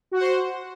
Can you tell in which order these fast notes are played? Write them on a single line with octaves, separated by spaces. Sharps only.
F#4 F#5 C5